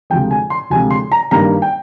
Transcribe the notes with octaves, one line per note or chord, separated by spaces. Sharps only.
D2 C3 F3 G#3 G5
G#5
C6
D2 C3 F3 G#3 G#5
C6
A#5
G2 D#3 G3 A#3 A#5
G5